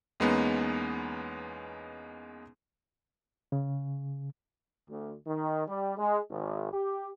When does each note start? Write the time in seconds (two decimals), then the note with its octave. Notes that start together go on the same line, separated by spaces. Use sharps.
0.20 E2 G#3 A#3 B3 C#4 D#4
3.52 C#3
4.89 D2
5.27 D#3
5.67 G3
5.98 G#3
6.30 G#1
6.73 G4